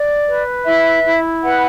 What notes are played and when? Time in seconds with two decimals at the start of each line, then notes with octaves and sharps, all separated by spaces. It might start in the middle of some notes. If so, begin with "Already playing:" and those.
Already playing: D5
0.28 B4
0.66 E4 E5
1.05 E4
1.43 B4 F#5